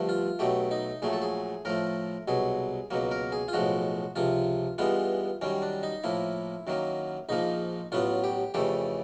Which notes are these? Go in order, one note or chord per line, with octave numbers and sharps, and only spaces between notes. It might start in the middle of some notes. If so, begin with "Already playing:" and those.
Already playing: G2 D3 F3 A3
F4
B1 B2 F#3 A3 G4
D#4
A#1 A#2 F#3 A3 G#4
A4
G#4
A2 F3 A3 A#4
C2 B2 F#3 G#4
C#2 B2 F#3 A#3
A#4
G#4
F4
B1 A2 F3 G#3 F#4
C#2 C3 F3 F4
G2 E3 G#3 B3 F4
F#2 D#3 G3 C#4
D4
D#4
A2 F3 A#3 E4
F#2 D#3 F#3 A#3
A#1 G#2 F3 A#3 D#4
A1 A2 F#3 B3 F4
G4
F2 C#3 E3 A3 G4